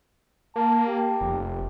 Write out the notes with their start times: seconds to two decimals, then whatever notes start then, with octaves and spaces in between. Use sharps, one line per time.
0.56 A#3 A5
0.88 G4
1.21 F1